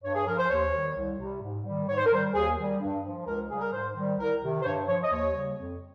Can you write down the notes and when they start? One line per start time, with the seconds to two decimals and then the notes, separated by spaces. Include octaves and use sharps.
0.04 G2 C#5
0.15 G#4
0.27 F3 A#4
0.38 C5
0.50 D#2 C#5
0.74 D#3 G3
0.96 C2
1.19 C3 G3
1.42 G#2
1.65 D#3 G3
1.88 G#2 C#5
1.97 C5
2.06 A#4
2.12 D#3 G3 C5
2.34 D#2 G#4
2.58 D#3 G3
2.80 G2
3.04 F3
3.27 C#2 A#4
3.49 C#3 G3 G#4
3.61 A#4
3.73 G#2 C5
3.96 D#3 G3
4.19 C2 A#4
4.43 C3 D#3
4.62 C5
4.65 G2 C#5
4.88 F3 C#5
5.04 D#5
5.12 D#2 C#5
5.34 C#3 G3
5.58 F2